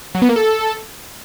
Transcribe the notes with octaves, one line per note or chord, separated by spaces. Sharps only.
F#3
B3
A#3
A4